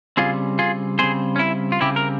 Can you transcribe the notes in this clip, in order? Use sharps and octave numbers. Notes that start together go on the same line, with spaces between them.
C#3 G3 C4 F4 G#4
F4 G#4
C#3 G3 C4 G#4 C5
C#4
E4
F4
C#3 G3 C4 E4 G4
A#4